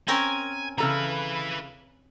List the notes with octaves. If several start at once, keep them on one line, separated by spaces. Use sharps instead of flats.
C4 C#4 A#4 G#5
C#3 E4 A4 B4 A#5